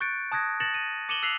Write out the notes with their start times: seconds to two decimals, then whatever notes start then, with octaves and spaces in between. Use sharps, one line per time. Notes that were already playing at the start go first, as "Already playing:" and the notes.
0.01 C#6 F#6 G6 A6 C#7 D7
0.32 A5 D#6 F#6 G#6 A#6
0.60 A6 A#6 C#7 E7 F#7
0.74 D#7
1.09 D6 C#7 D#7 E7 F#7 G7
1.23 E6 F#6 B6 C7 F7 F#7